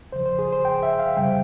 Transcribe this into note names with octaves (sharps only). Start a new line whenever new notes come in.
E2 C#3 F3 C5
C5
G#4
C5
G5
E5
F5
F2 C#3 G3 G5